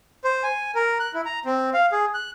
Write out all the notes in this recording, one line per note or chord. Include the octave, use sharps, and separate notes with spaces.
C5
G#5
A#4
F#6
E4
A#5
C4
F5
G#4
F#6